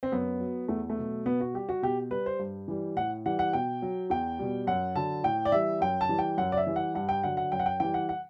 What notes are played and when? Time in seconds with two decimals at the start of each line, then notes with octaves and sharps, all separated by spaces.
0.03 C4
0.12 F#2 B3
0.40 F#3
0.68 E2 A3
0.90 A3
0.98 B2 F#3
1.26 B2 B3
1.40 F#4
1.54 G3 G4
1.69 F#4
1.82 B2 G4
2.11 G3 B4
2.26 C5
2.39 G2
2.68 E3 G3
2.96 A2 F#5
3.26 E3 G3 F#5
3.39 F#5
3.53 B2 G5
3.82 F#3
4.10 E2 G5
4.39 B2 G3
4.67 F#2 F#5
4.95 D3 F#3 A5
5.24 A2 G5
5.45 D5
5.52 E3 G3 E5
5.81 F#2 G5
6.01 A5
6.09 E3 G3
6.19 G5
6.38 F#2 F#5
6.52 D5
6.57 E5
6.67 E3 G3
6.76 F#5
6.95 G2 F#5
7.09 G5
7.23 D3 F#3 F#5
7.37 F#5
7.52 F#2 G5
7.59 F#5
7.66 G5
7.80 E3 G3 G5
7.94 F#5
8.09 F#5